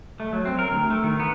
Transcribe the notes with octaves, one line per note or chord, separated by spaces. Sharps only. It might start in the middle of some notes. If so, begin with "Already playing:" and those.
A3
F#3
C4
A#4
D2
A3
D#3
B3